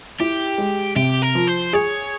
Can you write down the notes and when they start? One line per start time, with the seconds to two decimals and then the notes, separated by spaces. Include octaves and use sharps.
0.20 E4 G4
0.58 G#3
0.96 C3 G4
1.22 A#4
1.35 F3
1.48 C5
1.73 G#4 C#5